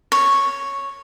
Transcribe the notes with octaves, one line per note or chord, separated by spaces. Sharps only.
C#5